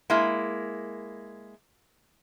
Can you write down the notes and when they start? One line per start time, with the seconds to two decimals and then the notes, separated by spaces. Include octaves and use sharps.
0.10 G#3 A#3 E4